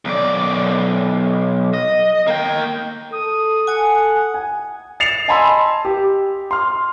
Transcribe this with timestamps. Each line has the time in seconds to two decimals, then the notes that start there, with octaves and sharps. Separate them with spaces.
0.05 B1 D5
1.74 D#5
2.27 A#3 G5
3.12 A4 D#6
3.67 F#5 G#5 D#6
4.34 G#5
5.00 A6 C7 C#7 E7 F7
5.28 D#5 G#5 A5 B5 C6 E6
5.85 G4
6.51 C6 F6